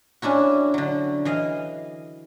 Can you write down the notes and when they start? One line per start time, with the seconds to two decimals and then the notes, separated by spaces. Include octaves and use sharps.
0.22 C#4 D4 E4 F#4
0.74 D3 F#3
1.25 E3 D#5 F5